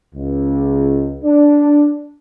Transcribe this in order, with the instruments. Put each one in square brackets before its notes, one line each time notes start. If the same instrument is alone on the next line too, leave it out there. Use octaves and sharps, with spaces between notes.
[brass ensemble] C#2
D4